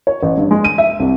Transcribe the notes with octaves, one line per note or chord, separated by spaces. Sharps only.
C#5
A1
G2
G#3
D#7
E5
C2